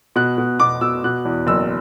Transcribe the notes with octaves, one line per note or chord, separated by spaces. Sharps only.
B2 F#6
B2
B2 D6
B2 E6
B2 F#6
E2
F#1 E6